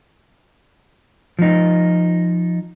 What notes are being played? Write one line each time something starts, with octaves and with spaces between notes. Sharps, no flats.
F3 D#4